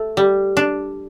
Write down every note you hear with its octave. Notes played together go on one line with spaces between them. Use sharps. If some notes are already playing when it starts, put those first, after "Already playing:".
Already playing: A3
G3
D4